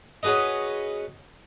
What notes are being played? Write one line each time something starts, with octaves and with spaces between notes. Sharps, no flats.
C#4 F#4 G#4 B4 D#5